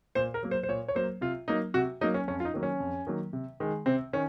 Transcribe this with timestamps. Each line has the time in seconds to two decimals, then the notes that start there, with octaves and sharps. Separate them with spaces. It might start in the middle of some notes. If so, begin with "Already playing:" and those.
0.15 A#2 C5
0.34 A#4
0.43 F#3 A#3
0.51 C5
0.63 C5
0.68 A#2 C#5
0.88 C#5
0.95 F#3 A#3 C5
1.21 C3 F4
1.48 F#3 A#3 D#4
1.74 C3 F#4
2.01 F#3 A#3 D#4
2.14 C#4
2.28 F2 C#4
2.40 F4
2.45 D#4
2.54 D#3 F#3 A#3
2.63 C#4
2.80 F2
3.07 D#3 F#3 A#3
3.33 C3
3.60 D#3 G#3
3.86 C3 C4
4.13 D#3 C#4